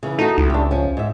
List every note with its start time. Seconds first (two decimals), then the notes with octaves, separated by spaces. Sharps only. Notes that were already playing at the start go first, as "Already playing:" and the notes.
0.03 C#3 E3
0.19 A3 D#4 F#4
0.38 C#2
0.50 D4 G4
0.71 F3 C#4
0.97 G#2 E5